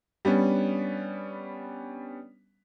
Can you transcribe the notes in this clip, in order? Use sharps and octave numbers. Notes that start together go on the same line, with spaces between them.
G3 B3 C#4 D4